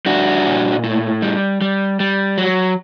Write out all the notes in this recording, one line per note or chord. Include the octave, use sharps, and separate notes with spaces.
G3 D4 F#4
A#2
A2
G3
G3
G3
F#3